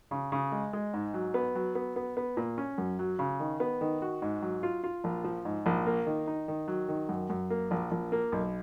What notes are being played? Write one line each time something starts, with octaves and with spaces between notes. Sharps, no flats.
C#3
C#3
G#3
G#3
G#2
F#3
B3
F#3
B3
B3
B3
A#2
C#4
F#2
F#3
C#3
D#3
B3
D#3
F#4
G#2
F#3
F4
F4
A#1
F3
G#2
A#1
A#3
D#3
D#4
D#3
F#3
D#3
F#2
F#2
A#3
A#1
A#1
A#3
B1